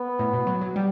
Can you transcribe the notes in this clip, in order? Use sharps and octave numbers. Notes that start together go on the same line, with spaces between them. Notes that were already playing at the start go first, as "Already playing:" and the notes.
Already playing: B3
A2
B2
F#3
F#3
G3